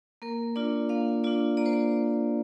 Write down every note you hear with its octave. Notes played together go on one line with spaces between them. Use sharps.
A#3 A#4
D4 F4 D5
A#3 F5
D4 F4 D5
A#3 D5
C5
D5